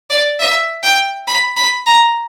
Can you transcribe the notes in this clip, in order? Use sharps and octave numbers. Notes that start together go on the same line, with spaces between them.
D5
E5
G5
B5
B5
A#5